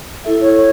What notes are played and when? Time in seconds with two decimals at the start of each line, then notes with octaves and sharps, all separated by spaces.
0.24 E4 A4 E5
0.41 C#5